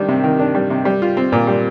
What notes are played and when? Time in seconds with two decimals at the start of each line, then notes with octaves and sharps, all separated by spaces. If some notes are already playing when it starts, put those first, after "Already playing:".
Already playing: D#3 G3 D4
0.08 C3
0.24 D#3
0.39 D4
0.55 G3
0.70 C3
0.85 G3
1.02 F4
1.17 C4
1.32 A#2
1.47 G3